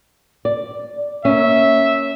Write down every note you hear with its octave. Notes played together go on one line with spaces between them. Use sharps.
D5
A#3 C#4 E5